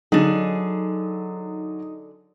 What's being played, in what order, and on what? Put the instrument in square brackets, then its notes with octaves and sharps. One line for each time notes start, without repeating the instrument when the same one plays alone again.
[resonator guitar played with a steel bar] D3 G#4 [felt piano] F#3 [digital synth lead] D#4